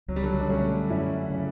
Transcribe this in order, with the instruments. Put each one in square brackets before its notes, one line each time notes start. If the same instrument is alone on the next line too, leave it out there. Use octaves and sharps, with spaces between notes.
[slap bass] C#2 [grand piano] F#3
[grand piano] G3
D3 F#3
D4
[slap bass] B2 G3 [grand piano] A3 C#4
[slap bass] F#2 [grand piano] C#4 E4
[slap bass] C#3 F#3